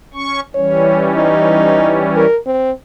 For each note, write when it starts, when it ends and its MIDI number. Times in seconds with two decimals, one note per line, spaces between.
0.14 0.40 61
0.14 0.40 85
0.55 2.25 52
0.55 2.25 55
0.55 2.25 61
0.55 1.07 73
1.15 2.05 63
2.16 2.37 70
2.46 2.71 60